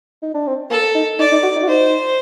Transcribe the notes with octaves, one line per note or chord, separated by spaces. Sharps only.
D#4
D4
C4
A#3 A4
D#4
D#4 D5
D#4
F#4
D#4
F#4
D#4 C5